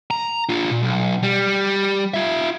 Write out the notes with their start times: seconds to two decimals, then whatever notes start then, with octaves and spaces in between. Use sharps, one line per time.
0.11 A#5
0.49 D4 F4
0.71 A#2
0.83 B1
1.23 G3
2.14 F4 E5